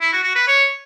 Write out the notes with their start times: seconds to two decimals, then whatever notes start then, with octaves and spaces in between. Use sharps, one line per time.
0.01 E4
0.13 F#4
0.24 F#4
0.35 B4
0.48 C#5